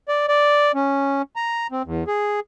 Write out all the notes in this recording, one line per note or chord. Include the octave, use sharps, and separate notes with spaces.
D5
D5
C#4
A#5
C4
E2
G#4